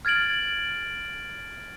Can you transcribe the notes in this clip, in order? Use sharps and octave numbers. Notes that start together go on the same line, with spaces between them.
F6 G#6 A6 D7 F#7